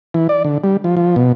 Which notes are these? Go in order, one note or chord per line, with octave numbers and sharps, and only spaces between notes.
E3
D5
D3
G3
F3
F3
B2